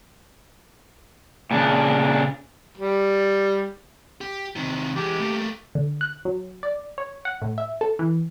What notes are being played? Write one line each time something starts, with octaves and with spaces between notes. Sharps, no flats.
A#2 C#3 D4
G3
G4
C3 D#3
E2 G#3 G4
A3 A#3
D3
F#6
F#3
D5
C#5
F#5
A2
E5
A4
E3